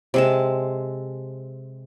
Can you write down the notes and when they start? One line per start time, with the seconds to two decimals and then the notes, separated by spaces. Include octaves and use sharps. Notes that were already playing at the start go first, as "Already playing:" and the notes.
0.14 C3 G#3 A5